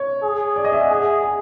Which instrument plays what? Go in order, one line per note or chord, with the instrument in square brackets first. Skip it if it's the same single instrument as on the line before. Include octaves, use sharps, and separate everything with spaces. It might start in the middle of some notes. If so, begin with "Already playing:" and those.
Already playing: [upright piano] C#5
[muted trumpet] G#4
[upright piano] D5
D#5
E5
F#5
[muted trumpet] G#4
[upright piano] G#5